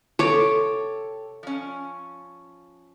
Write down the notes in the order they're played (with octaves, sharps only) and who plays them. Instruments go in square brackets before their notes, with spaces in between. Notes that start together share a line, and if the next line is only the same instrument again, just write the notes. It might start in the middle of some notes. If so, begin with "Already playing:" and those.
[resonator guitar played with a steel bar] C3 A4 [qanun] C#5 D6
[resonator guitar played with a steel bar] F3 C#4